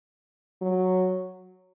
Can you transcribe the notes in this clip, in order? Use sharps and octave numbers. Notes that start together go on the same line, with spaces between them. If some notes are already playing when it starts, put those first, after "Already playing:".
F#3